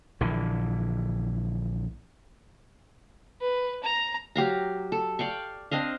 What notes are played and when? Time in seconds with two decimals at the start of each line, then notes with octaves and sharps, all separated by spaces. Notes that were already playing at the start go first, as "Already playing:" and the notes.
0.21 A#1 D3 E3
3.41 B4
3.83 A#5
4.36 F#3 G4 F5 A#5
4.92 A4
5.19 D5 F5 G5 C#6
5.71 C4 D4 D#5 F5